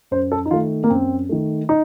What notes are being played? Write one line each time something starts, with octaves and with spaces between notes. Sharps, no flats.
F#2 C5
A4
D#4
D#3 A3 F4
A#3
F#2 C4
D#3 A3
D#4